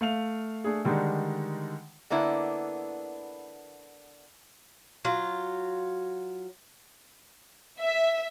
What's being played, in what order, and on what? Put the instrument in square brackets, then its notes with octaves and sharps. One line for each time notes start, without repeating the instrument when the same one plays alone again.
[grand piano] A3 F5 F7
A3 D4 G#4
D3 D#3 G3 G#3 D4 D#4
[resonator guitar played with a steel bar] D3 A#3 B3 D4 E4
[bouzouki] F#3 F4
[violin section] E5